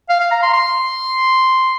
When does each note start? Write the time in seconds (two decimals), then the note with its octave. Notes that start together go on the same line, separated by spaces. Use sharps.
0.09 F5
0.20 F5
0.31 A#5
0.43 C6
0.53 C6